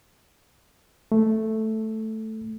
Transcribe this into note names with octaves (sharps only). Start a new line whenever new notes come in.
A3